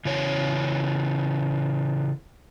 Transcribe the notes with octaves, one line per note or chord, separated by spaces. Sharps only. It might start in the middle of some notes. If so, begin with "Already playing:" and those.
C#3 E3 C#5